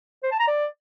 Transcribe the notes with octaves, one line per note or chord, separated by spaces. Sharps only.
C5
A5
A#5
D5